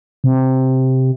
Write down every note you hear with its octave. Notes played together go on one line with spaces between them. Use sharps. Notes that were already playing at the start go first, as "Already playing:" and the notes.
C3